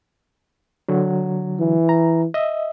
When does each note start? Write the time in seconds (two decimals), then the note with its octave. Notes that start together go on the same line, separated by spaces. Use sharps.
0.88 D3 F#3
1.60 E3
1.89 A#5
2.34 D#5 E5